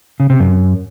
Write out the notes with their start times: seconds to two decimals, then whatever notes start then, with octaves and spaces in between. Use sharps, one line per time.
0.20 C#3
0.30 C3
0.40 F#2